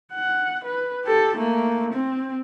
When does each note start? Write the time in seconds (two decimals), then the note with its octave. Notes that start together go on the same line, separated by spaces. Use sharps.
0.13 F#5
0.64 B4
1.04 G4 A4
1.36 A3 A#3
1.93 C4